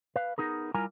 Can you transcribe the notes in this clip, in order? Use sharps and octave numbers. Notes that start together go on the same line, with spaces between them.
B4 F5
B3 D#4 G#4 A#4
G3 E4 F4 A#4 G#5 A#5